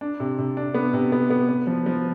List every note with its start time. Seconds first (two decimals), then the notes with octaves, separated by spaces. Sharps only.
0.01 D4
0.20 C3
0.38 C3
0.57 D4
0.74 B3
0.93 C3
1.12 B3
1.30 B3
1.49 B3
1.67 F3
1.86 F3